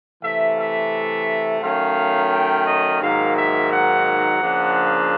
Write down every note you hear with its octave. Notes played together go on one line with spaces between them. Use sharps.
C3 E3 A3 E5
E5
D#3 F#3 A3 C#4 F5
G5
D#5
G#2 D#3 F#3 A#3 F5
E5
F#5
C#3 F3 A#3 D4